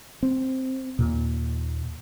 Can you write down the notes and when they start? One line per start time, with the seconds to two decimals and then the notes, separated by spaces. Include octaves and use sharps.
0.23 C4
0.99 D#2 A#2